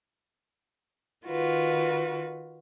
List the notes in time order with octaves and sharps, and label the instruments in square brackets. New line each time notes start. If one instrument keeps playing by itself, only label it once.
[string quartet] D#3 F4 F#4 B4